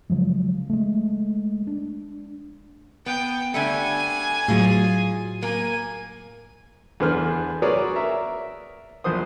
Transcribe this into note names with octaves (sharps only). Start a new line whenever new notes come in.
C#3 F3 F#3 G#3
G#3 A3
D4
B3 G5
D3 G3 A3 G#5
A2 F#3 F4 G#4
A#3 G#5
E2 D3 D4 B4 C5 F6
F#4 G#4 A#4 B4 C#5 D5
A#4 E5
A#1 E2 C5 D#6